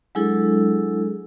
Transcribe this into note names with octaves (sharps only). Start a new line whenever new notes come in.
F#3 G#3 D4 E4 G#4 A4